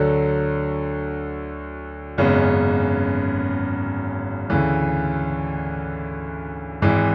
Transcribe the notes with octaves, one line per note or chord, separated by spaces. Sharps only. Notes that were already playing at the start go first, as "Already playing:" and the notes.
Already playing: D2 D3 F#3
G#1 F#2 C#3 G#3 B3
D2 C#3 E3
G#1 G#2 E3